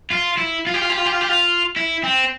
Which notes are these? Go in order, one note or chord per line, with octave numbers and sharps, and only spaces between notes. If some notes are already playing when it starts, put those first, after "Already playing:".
F4
E4
F4
G4
F4
G4
F4
G4
F4
G4
F4
E4
C4